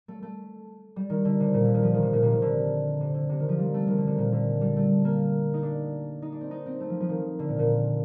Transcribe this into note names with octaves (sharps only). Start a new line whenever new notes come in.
A3
A3
G3
D#3
D3
C3
A#2
D3
D#3
F3
D#3
C3
A#2
C3
D#3
D3
C3
D3
C3
D#3
F3
G3
A3
D#3
D3
C3
A#2
D3
G3
A3
A#3
D#4
D4
D#4
D4
C4
D#4
C4
A3
F3
F3
D#3
D3
A#2
A#2